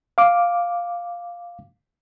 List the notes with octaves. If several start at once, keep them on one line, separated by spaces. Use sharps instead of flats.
F5 D6